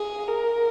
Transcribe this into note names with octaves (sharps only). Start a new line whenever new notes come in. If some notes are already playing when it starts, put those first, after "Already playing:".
Already playing: G#4
A#4